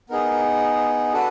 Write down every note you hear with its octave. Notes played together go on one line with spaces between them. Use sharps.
B3 D#4 G#4 A#4
D4 F#4 A4 B4